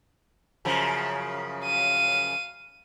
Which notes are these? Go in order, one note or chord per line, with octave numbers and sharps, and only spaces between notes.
F#2 C#3 F3
F5 D#7